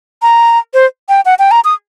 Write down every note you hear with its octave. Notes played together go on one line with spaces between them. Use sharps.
A#5
C5
G5
F#5
G5
A#5
D#6